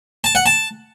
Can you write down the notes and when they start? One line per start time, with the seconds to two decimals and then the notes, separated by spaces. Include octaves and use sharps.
0.24 A5
0.35 F#5
0.46 A5